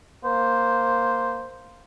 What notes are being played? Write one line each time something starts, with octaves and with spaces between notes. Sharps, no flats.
A#3 C5